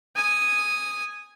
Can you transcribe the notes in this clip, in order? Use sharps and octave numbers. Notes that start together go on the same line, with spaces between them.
G#5 D#6